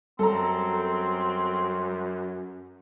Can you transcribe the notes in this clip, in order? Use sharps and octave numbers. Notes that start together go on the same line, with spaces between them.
F#2 G3 C4 A4 A#5